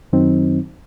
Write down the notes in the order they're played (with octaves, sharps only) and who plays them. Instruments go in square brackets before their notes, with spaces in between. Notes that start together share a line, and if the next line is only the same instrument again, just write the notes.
[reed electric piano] F#2 D#3 F#3 C4 D#4